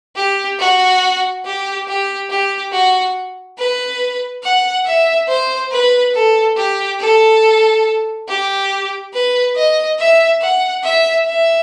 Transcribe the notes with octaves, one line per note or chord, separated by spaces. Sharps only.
G4
F#4
G4
G4
G4
F#4
B4
F#5
E5
C5
B4
A4
G4
A4
G4
B4
D#5
E5
F#5
E5
E5